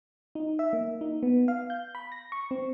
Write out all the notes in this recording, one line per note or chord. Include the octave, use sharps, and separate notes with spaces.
D#4
E5
A#3
D#4
B3
F5
G6
B5
A#6
C#6
C4